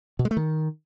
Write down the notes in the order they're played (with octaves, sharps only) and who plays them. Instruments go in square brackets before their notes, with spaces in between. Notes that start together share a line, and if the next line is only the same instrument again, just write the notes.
[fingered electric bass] B2
G#3
A3
D#3